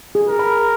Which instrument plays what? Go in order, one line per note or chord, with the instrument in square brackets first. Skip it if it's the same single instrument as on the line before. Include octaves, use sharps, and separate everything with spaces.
[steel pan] G#4
[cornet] A#4
[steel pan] B5